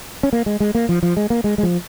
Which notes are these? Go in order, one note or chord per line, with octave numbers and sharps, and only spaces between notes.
C#4
A#3
G#3
G#3
A#3
F3
F3
G#3
A#3
G#3
G#3
F3